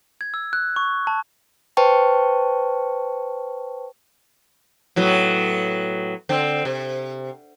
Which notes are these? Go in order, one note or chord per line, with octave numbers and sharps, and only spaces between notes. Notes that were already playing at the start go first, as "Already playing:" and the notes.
G#6
E6
F#6
C#6
A5
B4 C5 G5 A5 C#6
A2 F#3 B3
D3 C4
C3